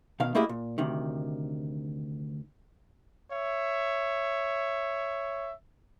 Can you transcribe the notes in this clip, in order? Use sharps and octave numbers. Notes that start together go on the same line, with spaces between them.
B2 D#3 F5
A3 A#3 E4 G4 G#4 D#5
A#2
D2 C3 D#3
C#5 E5